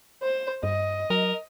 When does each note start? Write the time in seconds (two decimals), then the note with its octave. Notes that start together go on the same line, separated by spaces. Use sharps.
0.22 C5
0.63 G2 D#5
1.10 F#3 A#4